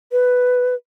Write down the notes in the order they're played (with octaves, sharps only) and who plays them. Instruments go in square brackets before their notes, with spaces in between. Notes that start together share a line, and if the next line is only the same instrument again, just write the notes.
[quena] B4